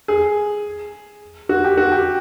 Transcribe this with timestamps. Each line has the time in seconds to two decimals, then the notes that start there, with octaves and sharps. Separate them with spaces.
0.08 G#4
1.49 F#4
1.64 G4
1.78 F#4
1.92 G4